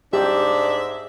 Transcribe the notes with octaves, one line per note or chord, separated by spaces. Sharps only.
G#2 D4 G4 E5